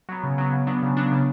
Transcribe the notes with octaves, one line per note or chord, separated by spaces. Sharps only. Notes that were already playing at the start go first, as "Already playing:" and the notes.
F#3 B3
C#3
F#3 B3
C#3
F#3 B3 D4
C#3
F#3 B3 D4
C#3